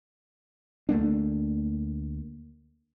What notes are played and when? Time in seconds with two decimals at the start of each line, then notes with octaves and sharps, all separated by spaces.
0.89 D2 A3 A#3 D4